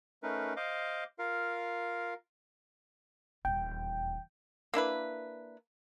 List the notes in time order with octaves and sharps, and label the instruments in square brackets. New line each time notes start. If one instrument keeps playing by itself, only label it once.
[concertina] A3 C#4 D#4 A#4 B4
C5 D#5 F5 D6
F4 A#4 F5
[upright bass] D#1 E2 [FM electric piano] G5
[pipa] A#3 D4 E4 B4